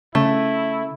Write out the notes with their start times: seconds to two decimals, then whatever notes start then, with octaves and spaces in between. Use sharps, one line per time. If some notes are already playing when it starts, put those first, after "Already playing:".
0.15 C#3 A3 E4